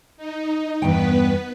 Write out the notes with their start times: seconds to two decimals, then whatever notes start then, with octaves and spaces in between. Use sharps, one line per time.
0.17 D#4
0.82 E2 G2 B3 B4 G5